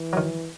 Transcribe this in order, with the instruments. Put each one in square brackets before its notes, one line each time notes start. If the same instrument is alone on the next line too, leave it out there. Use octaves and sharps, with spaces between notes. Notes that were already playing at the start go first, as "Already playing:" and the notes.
Already playing: [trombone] E3
[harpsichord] D#3 F#3